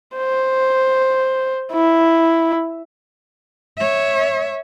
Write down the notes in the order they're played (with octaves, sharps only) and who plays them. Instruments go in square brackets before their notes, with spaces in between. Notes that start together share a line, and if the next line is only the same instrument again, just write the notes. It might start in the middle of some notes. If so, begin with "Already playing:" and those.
[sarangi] C5
E4
[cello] C#5 E5